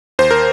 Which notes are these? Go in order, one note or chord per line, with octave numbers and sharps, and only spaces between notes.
D#2 C5
A#4